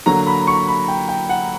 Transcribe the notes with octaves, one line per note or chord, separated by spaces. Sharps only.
D3 F#3 A#3 A#5
B5
C#6
B5
G5
G5
F#5